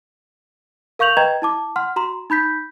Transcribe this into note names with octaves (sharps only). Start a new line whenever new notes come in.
A#4 F5 C#6 G6 F7 F#7
B4 D#5 G5 A#5 G#6
E4 A5 D6
F#5 C6 F6
F#4 A#5 C6
D#4 B5 G6 B6